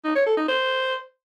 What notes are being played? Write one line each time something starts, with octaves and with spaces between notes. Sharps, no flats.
D#4
C#5
A4
D#4
C5